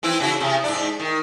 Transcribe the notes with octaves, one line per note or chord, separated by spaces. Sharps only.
E3 C4 E4
C#3 E4 F#4
C3
G#2 D4
D#3